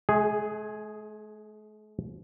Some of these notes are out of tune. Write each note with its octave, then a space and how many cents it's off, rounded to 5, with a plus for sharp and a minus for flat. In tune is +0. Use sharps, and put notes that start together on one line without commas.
G#3 +45 G#4 +0